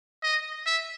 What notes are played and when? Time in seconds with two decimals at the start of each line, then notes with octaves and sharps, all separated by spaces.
0.23 D#5
0.66 E5